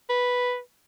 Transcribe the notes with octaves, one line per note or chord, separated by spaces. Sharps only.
B4